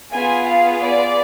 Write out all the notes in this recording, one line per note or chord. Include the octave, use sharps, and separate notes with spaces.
B3 F4 G#4 G#5
F5
D5